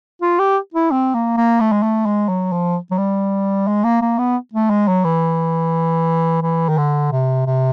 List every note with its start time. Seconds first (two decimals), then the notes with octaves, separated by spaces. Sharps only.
0.22 F4
0.39 G4
0.74 E4
0.91 C4
1.14 A#3
1.37 A#3
1.60 A3
1.72 G#3
1.83 A3
2.06 G#3
2.28 F#3
2.52 F3
2.91 F#3
2.98 G3
3.67 G#3
3.84 A#3
4.01 A#3
4.18 B3
4.54 A3
4.70 G#3
4.88 F#3
5.05 E3
6.42 E3
6.69 D#3
6.78 D3
7.12 C3
7.46 C3